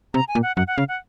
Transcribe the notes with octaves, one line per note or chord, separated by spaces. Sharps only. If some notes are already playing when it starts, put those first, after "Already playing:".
C3 A#5
G#5
A#2
F#5
F#2 F#5
F#5
C#3 F5
F#5